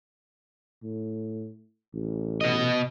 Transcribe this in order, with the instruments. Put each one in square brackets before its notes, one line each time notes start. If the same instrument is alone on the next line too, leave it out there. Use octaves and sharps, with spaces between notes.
[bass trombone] A2
A1
[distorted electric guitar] B2 D#5